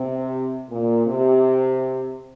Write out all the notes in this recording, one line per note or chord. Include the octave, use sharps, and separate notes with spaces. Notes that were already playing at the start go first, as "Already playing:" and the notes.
Already playing: C3
A#2
C3